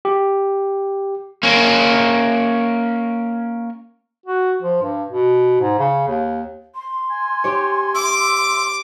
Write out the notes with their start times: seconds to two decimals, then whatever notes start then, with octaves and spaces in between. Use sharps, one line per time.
0.05 G4
1.43 A#3 C#4
4.26 F#4
4.62 F3
4.83 G2
5.08 B2
5.61 G#2
5.79 C#3
6.08 D#2
6.74 C6
7.11 G#5
7.44 G4 C#5
7.95 E5 D6